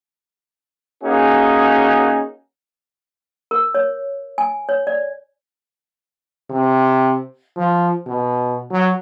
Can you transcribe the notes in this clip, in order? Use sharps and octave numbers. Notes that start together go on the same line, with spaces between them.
A#3 C#4 D#4 F#4 G#4
A#4
C#5
G#5
C#5
D5
C3
F3
B2
F#3